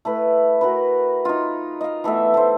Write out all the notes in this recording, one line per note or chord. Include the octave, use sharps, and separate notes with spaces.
A3 E4 B4
F#4 A#4 B4
D#4 F4
D#5 F5
E3 A3 B3 E5
A3 C5